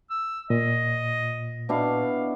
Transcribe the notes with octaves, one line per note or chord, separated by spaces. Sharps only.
E6
A#2 D#5
B2 D4 E4 F5